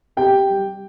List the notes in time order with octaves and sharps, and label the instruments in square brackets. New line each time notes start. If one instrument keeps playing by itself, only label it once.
[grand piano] C3 G4 G5
G3